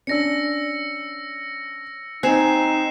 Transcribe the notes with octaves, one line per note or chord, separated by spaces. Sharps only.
C#4 D4 E6 A#6 C#7
C4 D#4 G#5 F#6 C7 E7